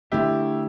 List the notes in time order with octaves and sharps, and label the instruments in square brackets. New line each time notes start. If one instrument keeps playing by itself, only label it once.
[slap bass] D3 A3 D4 [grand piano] E4 G4